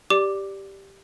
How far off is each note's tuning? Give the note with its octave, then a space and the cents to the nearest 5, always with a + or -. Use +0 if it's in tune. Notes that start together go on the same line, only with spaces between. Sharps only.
G4 +0 D5 +0 D6 +5